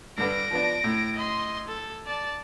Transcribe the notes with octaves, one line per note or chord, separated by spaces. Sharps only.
G2 D3 B4 A#6 D7
F3 B3 D4
A2
D#5 C6
A4
D5 A5